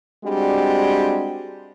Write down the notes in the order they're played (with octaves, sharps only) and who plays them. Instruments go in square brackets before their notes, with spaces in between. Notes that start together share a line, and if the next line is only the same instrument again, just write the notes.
[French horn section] G3 G#3 C4 D4 F#4 G4